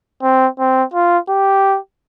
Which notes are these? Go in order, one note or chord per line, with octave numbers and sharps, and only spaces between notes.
C4
C4
F4
G4